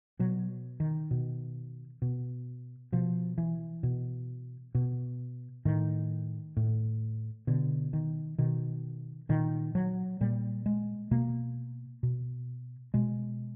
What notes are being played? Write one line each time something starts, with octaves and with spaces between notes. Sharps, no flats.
B2 F#3
D#3
B2
B2
B2 F3
E3
B2
B2
A2 D#3
A2
B2 D3
D#3
B2 D#3
A#2 D#3
F#3
A#2 G3
G#3
B2 A#3
B2
B2 G#3